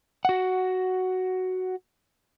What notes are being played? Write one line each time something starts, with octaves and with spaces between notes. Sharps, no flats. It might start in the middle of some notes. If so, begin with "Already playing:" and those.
F#4 F#5